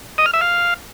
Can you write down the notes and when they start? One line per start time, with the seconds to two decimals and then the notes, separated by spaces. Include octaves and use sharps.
0.18 D#5
0.26 F6
0.34 E5
0.41 F5